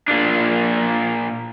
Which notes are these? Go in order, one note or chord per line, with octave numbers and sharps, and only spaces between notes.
A#2 D4